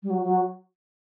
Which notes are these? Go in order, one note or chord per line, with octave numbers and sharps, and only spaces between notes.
G3
F#3
F#3